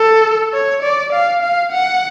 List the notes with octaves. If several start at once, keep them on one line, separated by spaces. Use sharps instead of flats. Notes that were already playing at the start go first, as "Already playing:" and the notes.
Already playing: A4
C#5
D5
F5
F5
F#5